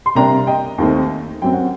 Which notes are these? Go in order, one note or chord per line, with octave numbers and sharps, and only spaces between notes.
C6
C3 G3 A#3 D4 G5 A#5
D#5 G5
D#2 D#3 A3 C4
F#2 F#3 C4 G5
F#5